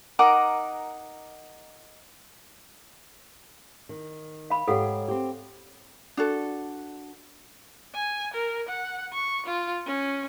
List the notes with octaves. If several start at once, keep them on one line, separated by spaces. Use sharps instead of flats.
D#4 A#4 F#5 D6
D#3
F5 B5
G#2 G4 A4 C#5 F5 F#5
C4 G4
D4 F#4 A4
G#5
A#4
F#5
C#6
F4
C#4